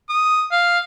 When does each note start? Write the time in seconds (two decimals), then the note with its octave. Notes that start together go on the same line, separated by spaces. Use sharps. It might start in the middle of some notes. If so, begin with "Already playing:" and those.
0.10 D#6
0.52 F5